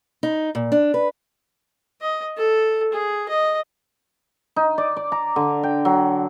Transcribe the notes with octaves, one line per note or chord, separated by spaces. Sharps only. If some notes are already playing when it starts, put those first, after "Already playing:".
D#4
A#2
D4
B4
D#5
A4
G#4
D#5
D#4
D5
D5
A#5
D3
G5
F#3